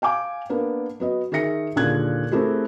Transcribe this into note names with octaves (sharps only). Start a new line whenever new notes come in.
F5 G5 G#5 D6
A#3 B3 D4
F#3 B3 D#5
D#3 G#4 E5 A#6 C#7
D#2 A#2 D3 G#4 F#6 G#6
A3 C4 E4 G4 G#4 A#4